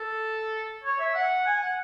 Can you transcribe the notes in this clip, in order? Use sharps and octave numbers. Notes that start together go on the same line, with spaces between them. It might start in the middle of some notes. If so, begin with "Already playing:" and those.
Already playing: A4
C#5
E5
F#5
G#5
F#5